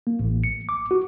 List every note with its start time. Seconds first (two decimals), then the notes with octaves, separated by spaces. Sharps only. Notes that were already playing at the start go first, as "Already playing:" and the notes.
0.07 A#3
0.19 A1
0.44 C#7
0.69 D6
0.91 F#4